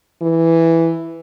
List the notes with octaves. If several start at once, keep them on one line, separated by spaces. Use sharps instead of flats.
E3